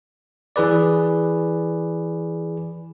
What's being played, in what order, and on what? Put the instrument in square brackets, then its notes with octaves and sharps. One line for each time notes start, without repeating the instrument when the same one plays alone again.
[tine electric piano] E3 G#4 B4 D5